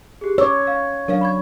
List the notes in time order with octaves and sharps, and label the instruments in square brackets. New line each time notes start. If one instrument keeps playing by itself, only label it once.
[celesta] G4 G#4
[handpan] C#5 [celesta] D6 E6
[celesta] F5
[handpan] F#3 D4 C#5 [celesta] A#4 F5
[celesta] B5 C#6 G#6